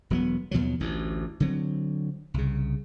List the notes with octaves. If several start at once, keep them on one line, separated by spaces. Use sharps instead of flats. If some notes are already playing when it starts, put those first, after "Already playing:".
E1 F#3 A3 B3
D#2 B2 F3 F#3
A1 D2
D3 F#3 C4
C2 C#3